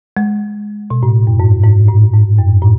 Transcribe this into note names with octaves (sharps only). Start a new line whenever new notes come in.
G#3
B2
A2
F#2
G#2
G#2
A2
G#2
F#2
A2